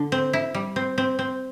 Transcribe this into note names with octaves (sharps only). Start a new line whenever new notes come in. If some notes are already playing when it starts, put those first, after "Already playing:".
Already playing: D3
C4
E4
G3
C4
C4
C4